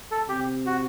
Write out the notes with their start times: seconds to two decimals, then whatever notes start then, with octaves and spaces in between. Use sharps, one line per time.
0.11 A4
0.29 C3 G4
0.66 F#4